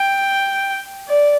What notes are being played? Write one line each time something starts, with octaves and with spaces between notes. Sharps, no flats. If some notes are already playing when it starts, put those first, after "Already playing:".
Already playing: G5
D5